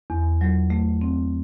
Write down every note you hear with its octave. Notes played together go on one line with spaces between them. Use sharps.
E2
F#3
A3
C4